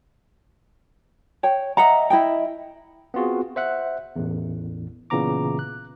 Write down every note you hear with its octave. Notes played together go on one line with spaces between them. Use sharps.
C#5 G5
D#5 E5 F#5 A#5
E4 D#5 G5
B3 C4 F4 F#4 G#4
C5 E5 F#5 F#6
A1 E2
A#2 C#3 E3 B3 A#5 D6
F#6